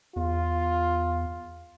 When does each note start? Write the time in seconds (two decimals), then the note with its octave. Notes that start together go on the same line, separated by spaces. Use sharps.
0.16 E2 F4